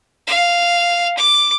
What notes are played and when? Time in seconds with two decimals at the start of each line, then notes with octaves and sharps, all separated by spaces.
0.27 F5
1.17 D6